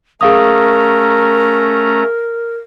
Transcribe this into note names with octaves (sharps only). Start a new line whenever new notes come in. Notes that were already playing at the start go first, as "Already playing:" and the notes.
A3 C#4 G#4 A#4 F5 A#5 D#6